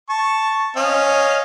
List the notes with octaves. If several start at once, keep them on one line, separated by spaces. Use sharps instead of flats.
A5 C#6
C#4 D#5 F5